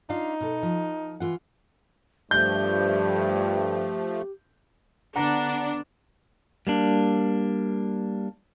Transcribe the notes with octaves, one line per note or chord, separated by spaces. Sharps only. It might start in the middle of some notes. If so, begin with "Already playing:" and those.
D4 D#4 F4 F5
B2 A4
F3
E3 F4 F#5
G2 F3 A3 G4 G6
D3 B3 D4 F#5 A#5
G3 A#3 D4